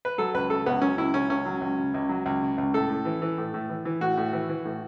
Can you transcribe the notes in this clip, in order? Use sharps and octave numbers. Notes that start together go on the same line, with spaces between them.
B4
F#3 A4
C#2 B4
C#3 A4
C#2 B3
F#3 C#4
C#2 E4
C#3 C#4
C#2 C#4
F#3
C#2
C#3
C#2
F#3
C#2
C#3
C#2
A2 A4
A2
E3
E3
A2
A2
E3
E3
A2 F#4
A2
E3
E3
A2